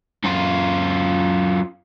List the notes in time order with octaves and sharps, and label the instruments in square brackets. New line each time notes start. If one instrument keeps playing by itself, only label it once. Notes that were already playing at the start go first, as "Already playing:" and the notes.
[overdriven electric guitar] F#2 F4